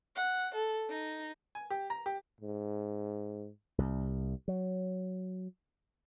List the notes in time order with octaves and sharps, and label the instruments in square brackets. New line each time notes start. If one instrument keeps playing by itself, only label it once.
[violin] F#5
A4
D#4
[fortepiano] G#5
G4
A#5
G4
[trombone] G#2
[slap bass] C2
F#3